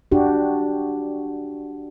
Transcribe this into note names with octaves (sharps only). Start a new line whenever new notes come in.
D4 F#4 G4